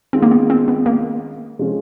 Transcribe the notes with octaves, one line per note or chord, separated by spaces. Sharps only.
D#3 G#3 C4 C#4 F4
A#3
B3
C4
B3
A#3
C3 F3 G#3 C#4